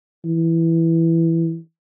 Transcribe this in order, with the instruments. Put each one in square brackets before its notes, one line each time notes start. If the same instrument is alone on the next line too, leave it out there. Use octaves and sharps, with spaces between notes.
[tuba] E3